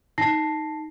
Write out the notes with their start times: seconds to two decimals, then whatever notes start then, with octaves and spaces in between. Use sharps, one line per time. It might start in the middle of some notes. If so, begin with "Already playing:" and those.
0.18 D#4 A5 A#6 C7